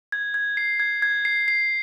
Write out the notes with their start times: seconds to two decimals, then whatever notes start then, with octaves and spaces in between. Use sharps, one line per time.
0.12 G#6
0.34 G#6
0.57 C7
0.80 G#6
1.02 G#6
1.25 C7
1.48 C7